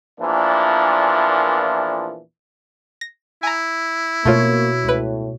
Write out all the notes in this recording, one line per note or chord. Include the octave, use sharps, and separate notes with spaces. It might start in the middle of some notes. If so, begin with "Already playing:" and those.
E2 A#2 E3 F3 A#3 D4
A#6
E4 G#5 A#5
B2 A3 A#3 F4 C#5
C#2 A2 B4